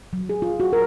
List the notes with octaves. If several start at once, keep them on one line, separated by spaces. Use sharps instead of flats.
F#3
G#4
F4
F#4
A#4